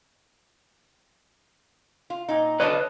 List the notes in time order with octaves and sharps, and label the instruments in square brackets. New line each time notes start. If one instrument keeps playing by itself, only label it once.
[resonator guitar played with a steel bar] F4
A#2 D#4
[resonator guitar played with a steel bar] D3 D4 A5 [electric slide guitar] B4 C#5 D#5